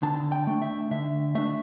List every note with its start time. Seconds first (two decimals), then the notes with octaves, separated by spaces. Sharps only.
0.03 D3 A5
0.32 G5
0.47 A3 D4
0.62 E5
0.91 D3 E5
1.35 A3 D4 E5